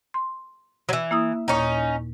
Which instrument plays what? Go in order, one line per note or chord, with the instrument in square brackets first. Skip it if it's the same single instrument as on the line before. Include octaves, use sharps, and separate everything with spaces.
[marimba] C6
[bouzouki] E3 F#3
[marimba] A#3 E4 D#6
[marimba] D#2 A#2 [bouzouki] C#4 D#4